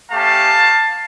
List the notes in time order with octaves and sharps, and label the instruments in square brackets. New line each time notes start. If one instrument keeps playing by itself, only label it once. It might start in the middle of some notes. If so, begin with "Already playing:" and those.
[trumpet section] A3 C#4 G4 F5 A5